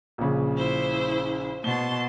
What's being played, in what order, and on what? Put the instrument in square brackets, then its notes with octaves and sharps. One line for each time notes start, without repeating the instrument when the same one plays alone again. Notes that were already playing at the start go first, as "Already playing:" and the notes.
[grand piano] A#1 C#3
[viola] E4 C5
[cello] B2 [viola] A5 C6 [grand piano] G7